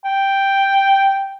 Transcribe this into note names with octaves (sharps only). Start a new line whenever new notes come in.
G5